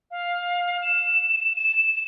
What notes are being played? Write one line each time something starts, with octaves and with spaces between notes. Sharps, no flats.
F5
E7
E7